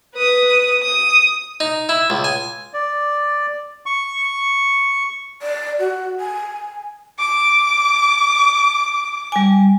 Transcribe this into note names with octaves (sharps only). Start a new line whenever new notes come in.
B4 D#6
D#6
D#4
E4
C#2
G#5
D5
C#6
D5
F#4
G#5
D6
G3 G#5